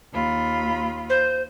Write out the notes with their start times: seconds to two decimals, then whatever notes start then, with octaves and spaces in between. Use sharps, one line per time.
0.12 D#2 F4 B5
1.10 C5